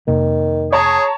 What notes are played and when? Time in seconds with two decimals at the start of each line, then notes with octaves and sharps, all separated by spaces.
0.08 F2 C3 D#3 A#3
0.72 G#4 C#5 A5 A#5